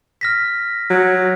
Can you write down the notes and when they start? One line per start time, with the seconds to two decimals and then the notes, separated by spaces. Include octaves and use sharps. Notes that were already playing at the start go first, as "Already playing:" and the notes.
0.21 F6 A#6 B6
0.90 F#3